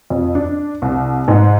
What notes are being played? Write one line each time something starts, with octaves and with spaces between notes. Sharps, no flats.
F2
D4
C2
G#2